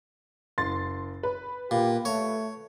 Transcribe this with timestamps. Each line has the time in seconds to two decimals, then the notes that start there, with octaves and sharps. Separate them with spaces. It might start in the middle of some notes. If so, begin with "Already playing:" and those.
0.58 F#1 C6 A6
1.23 B4
1.71 A#2 G4
2.05 A3 C#5